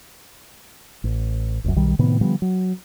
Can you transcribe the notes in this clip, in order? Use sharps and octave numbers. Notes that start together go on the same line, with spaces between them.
A1
F1 C#2 F#2
B1 D#3 G3
A2 C3 D#3 B3
D3 F3 G3 B3
F#3